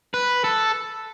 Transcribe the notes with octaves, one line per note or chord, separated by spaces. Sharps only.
B4
A4